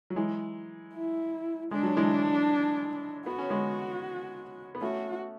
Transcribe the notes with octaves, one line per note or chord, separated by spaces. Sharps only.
F#3
E3 G#3
E4
G#3 D4
F#3
E3 G#3
B3 F#4
C#4
G#3 B3
B3
A3 C#4 F#4